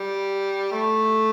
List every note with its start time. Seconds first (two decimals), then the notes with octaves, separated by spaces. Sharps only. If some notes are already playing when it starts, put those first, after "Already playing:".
Already playing: G3
0.72 A3